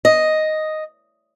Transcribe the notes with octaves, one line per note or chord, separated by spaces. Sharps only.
D#5